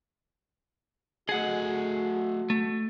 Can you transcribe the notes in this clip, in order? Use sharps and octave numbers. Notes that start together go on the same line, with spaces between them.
A3 F#4 G#4 D#5 F#5
A3